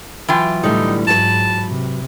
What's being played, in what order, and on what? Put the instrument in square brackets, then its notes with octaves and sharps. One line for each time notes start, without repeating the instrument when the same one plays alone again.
[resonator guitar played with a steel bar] E3 F4 G5 [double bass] F#3
[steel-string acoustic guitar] A2 D3 G3 [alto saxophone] D#4
[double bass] G#2 [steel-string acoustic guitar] F#3 B4 [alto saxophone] A5
[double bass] C3